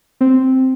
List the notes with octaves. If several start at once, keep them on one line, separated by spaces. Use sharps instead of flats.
C4